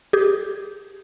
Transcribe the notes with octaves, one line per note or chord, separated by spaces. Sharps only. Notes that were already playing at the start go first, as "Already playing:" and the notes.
G4 G#4